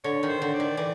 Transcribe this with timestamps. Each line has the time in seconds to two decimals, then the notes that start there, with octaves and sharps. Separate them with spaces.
0.04 D3 C#5
0.23 D#3
0.29 C5
0.42 D3
0.53 D5
0.60 D#3
0.77 E3 D5